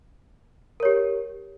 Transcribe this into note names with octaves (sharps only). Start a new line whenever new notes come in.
G4 A#4 C#5